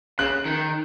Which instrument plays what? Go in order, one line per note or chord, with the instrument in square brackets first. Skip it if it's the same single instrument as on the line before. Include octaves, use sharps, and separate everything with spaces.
[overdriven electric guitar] C#3 [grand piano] F#6
[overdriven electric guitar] D#3